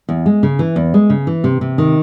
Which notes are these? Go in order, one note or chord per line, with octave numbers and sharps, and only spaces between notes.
E2
G#3
C#3
E3
E2
G#3
C#3
E3
C3
C3
D#3